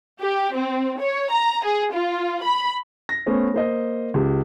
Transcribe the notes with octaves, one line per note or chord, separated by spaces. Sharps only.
G4
C4
C#5
A#5
G#4
F4
B5
A#6
A3 B3 C#4 C5
A#3 C5 D#5
C#2 G4